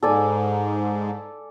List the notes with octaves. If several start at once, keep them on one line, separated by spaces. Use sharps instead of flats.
G#2 A4 D5 G#5